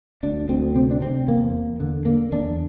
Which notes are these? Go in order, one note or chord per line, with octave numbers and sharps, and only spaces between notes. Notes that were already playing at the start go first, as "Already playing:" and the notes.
D2 D4
D2 C4
C3 C4
D4
C3 C4
E2 A#3
E2
D3
D3 A#3
E2 D4